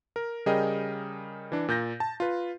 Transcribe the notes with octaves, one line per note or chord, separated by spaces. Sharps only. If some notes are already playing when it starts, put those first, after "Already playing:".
A#4
C#3 G3 G#4 A#4 D#5 G5
E3 D4
A#2 G6 A#6
A5
F4 B4